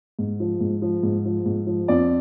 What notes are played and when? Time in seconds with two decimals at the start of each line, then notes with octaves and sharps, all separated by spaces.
0.19 G#2
0.40 F3
0.61 G#2
0.82 F3
1.03 G#2
1.25 F3
1.46 G#2
1.67 F3
1.88 F2 D5